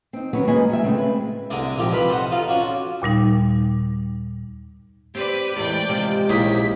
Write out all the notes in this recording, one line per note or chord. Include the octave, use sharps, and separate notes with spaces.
C4 D#4
D#3 F#3 B3 C#4 C#5
G#3 A#3 F4 B4 D#5 G#5
D#3 F3 G3 E5
C#3 G#3 A3 B3 C4
B4
C2 D3 G#3 D4
A#1 F3 D#4 G4
C2 F2 B4 F5 B5 C6
A4 C5 D#5 F#5
D#4 F4 A4 F5
C#4 D4 F#4
D#2 A#2 G3 D#4
C4 G4 B4 C5 D5
E2 A2 E3 G#3 D5 G5
C3 F3 C4
A#1 C4 C#4 D#4 E4 B6